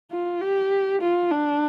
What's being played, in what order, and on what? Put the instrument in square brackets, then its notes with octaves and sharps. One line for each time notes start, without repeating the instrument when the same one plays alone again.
[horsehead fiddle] F4
G4
F4
D4